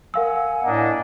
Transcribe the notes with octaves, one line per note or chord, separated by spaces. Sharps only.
A#4 F5 F#5 G#5 E6
A2 A#3 D4 D#5